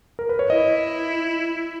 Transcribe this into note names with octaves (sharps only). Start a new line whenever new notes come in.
A#4
B4
C#5
E4 D#5